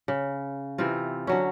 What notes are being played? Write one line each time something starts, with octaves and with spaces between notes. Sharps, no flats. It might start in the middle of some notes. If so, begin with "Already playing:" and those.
C#3
C3 E3 C4 F4
D3 F#3 C#4